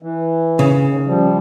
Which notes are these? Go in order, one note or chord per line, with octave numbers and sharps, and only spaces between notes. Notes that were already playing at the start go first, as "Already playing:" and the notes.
E3
C#3
D#2
F3 G3